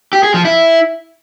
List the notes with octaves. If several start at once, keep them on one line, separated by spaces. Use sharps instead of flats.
G4
G#4
F3
E4